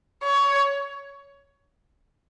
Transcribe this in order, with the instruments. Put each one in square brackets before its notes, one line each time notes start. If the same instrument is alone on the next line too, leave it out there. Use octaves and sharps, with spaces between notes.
[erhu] C#5